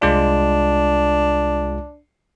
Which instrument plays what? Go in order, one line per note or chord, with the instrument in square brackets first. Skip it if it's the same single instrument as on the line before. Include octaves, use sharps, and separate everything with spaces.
[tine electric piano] C2 G#3 F4 [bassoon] D4